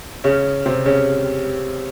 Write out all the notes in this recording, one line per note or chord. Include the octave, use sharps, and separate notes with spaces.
C#3 C#4
C3 C4
C#3 C#4